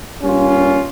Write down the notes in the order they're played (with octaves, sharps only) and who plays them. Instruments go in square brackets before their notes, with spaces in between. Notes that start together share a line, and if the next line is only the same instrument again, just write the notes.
[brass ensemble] G2 G3 A#3 C#4 F4